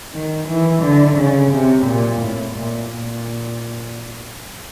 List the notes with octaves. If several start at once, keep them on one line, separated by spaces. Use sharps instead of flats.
D#3
E3
D3
C#3
C3
A#2
A2
A#2
A#2